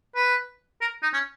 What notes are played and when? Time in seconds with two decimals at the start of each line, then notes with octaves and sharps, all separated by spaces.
0.15 B4
0.81 A#4
1.03 D#4
1.13 C#4